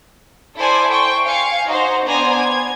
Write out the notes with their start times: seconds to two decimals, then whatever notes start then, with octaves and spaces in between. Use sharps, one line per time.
0.56 E4 A4 C5 D5 G#5
0.89 C5 G5 C#6
1.24 F5 G#5 C#7
1.66 D#4 F#4 C5
2.05 B3 D4 C5 G5 G#5 A#5
2.39 G#6